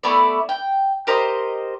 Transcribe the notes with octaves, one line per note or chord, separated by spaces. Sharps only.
A3 B3 E4 D5
G5
G4 A#4 C5 D#5